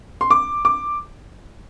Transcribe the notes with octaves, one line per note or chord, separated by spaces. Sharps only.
C6
D6
D6